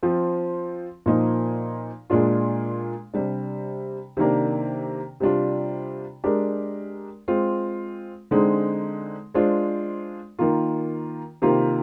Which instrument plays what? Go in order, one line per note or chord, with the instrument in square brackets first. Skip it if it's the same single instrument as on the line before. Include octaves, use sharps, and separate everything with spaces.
[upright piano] F3 C4 F4
A#2 F3 A#3 D#4
A#2 G#3 D4 F4
C3 G3 D4
C3 D#3 A#3 D4
C3 G3 D4 F4
G#3 D4 G4 A#4
G#3 C4 F4
D3 G#3 C4 D#4
G#3 D4 F4 C5
D#3 A#3 F4
C3 D#3 A#3 F4